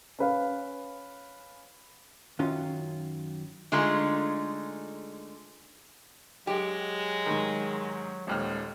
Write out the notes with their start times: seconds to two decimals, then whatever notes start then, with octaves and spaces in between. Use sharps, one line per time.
0.19 C#4 B4 F5
2.39 F#2 D#3 F#3 C#4 F4
3.72 D3 G#3 A3 D#4 F4 G#4
6.47 F#3 G#3 G4
7.26 G#2 D#3
8.27 D#1 D#2 G#3 F6